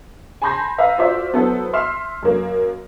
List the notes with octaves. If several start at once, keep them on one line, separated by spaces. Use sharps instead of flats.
G#5 A5 B5 C6 G6 A#6
B4 E5 F5 A#5
F4 F#4 C5 D5 E5
F#3 B3 E4 A4 C5
E5 C6 F6 C7 E7
F#2 A#3